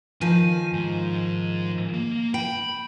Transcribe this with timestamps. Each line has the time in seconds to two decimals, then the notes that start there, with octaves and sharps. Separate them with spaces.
0.21 D#3 F3 G#5
0.73 G#2
1.94 A#3
2.34 G5 B5